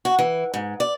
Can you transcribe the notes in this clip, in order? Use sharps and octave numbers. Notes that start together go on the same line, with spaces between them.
F#4
E3
G#2
D5